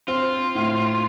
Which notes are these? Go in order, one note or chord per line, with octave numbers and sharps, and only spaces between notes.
C4 F4
A2